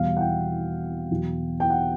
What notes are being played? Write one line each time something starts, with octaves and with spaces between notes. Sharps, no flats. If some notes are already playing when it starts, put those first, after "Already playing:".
Already playing: E2 B2 G3 F5
F#5
G5
E2 B2 F#3
G5
F#5